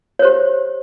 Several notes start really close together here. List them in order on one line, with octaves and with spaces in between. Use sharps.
C#5 C5 G4